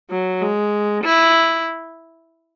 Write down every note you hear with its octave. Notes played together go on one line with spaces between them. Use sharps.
F#3
G#3
E4